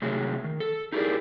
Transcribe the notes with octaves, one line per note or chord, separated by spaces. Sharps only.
C3 D#3 F#3 G#3 A3
D#3
A4
D#4 E4 G4 G#4 A#4 D5